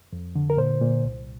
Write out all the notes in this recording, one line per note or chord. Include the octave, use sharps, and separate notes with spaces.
F2
D3
A#4
A#2 C5
A#2
C2